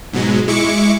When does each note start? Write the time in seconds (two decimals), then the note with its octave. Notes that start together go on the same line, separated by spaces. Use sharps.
0.13 G#2 B2 F#3 G#3
0.48 G#3 E4 C#6 D6 C#7